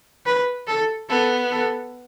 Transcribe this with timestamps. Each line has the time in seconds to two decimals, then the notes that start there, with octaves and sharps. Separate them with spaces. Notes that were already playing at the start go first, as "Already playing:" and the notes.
0.26 B4
0.67 A4
1.09 B3 A4
1.51 A4